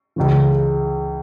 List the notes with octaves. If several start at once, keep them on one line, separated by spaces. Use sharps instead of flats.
C#2 C#3 E3